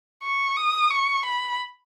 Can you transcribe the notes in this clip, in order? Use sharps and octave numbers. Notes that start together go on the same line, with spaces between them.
C#6
D#6
C#6
B5